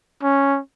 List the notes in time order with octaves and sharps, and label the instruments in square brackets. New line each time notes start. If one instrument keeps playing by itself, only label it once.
[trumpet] C#4